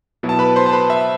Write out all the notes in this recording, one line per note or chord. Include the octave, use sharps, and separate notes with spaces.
B2 F#3 B3 E4
A5
B4 B5
C5 C6
A5
B4 B5
E5